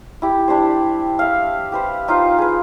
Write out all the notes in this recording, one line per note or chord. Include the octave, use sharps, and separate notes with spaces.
E4 G4
G3 D4 G4 C5
E5 F5
G4 B4 C5
D#4 F4 C5 F5
G#4 B4